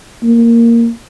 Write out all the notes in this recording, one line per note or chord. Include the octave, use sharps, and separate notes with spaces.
A#3